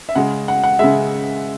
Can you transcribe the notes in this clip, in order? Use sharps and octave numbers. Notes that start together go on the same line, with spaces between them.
E5
C#3 G#3 F#5
F#5
F#5
C#3 G#3 E5